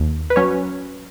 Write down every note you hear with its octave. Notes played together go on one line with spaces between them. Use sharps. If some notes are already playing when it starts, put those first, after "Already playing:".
Already playing: D#2
B4
F#3 C#4 C#5